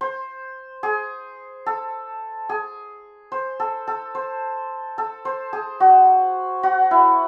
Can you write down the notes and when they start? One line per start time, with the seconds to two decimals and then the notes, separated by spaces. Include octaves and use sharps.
0.01 C5
0.83 G#4
1.66 A4
2.49 G#4
3.32 C5
3.60 A4
3.88 A4
4.15 C5
4.98 A4
5.25 C5
5.53 G#4
5.80 F#4
6.63 F#4
6.91 E4